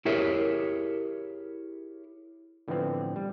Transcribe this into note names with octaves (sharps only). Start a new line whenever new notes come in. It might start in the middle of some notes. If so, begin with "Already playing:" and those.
E4 G4 G#4 A#4 C#5 E5
A2 D3 E3 F3 B3 C4
G3